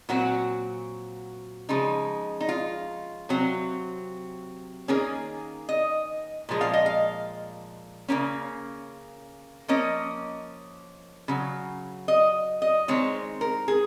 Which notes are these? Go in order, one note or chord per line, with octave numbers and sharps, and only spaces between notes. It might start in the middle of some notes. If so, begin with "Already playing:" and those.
A#2 F#3 C4 F#4
C#3 F3 G#3 D#4
D#4
F4
C3 F#3 C4
D#3 A#3 C#4 G#4
D#5
A#2 F3 G#3
F5
D#5
F5
C#3 F#3 A#3 C#4
F3 A#3 C#4 D#5
C#3 F#3
D#5
D#5
D#3 G#3 C4 C#5
A#4
G#4